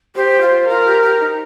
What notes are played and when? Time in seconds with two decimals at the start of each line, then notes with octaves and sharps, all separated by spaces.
0.15 G4 C5
0.41 F4
0.67 F4 A#4
0.85 G4
1.02 G4
1.20 D#4